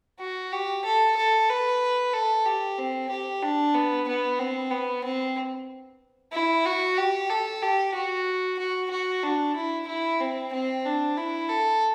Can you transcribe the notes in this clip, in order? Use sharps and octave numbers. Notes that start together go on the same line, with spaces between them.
F#4
G4
A4
A4
B4
A4
G4
C4
G4
D4
B3
B3
C4
B3
C4
E4
F#4
G4
A4
G4
F#4
F#4
F#4
D4
E4
E4
C4
C4
D4
E4
A4